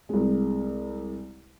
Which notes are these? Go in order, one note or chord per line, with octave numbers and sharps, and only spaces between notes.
C2 G#3